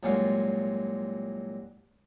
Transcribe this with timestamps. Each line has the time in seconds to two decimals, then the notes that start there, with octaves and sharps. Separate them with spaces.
0.03 C2 A#2 F#3 G#3 F4 F5